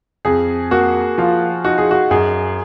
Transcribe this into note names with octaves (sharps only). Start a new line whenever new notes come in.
F2 G#4
A#3 F#4
F3 F4
D#4 F#4
G#4
F#4
F#2 G#4